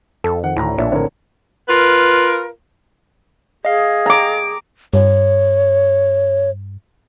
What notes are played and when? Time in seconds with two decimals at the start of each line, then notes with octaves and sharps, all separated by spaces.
0.24 F2 A4
0.44 D#3 F#5
0.56 D2 A2 A#5
0.78 A#1 A#2 D4 C#5 E5
0.92 A2 D3 C4 A#4 C#5
1.69 F4 A#4 B4
3.65 G#4 D#5 F5
4.06 A#5 D6
4.94 G2 C#5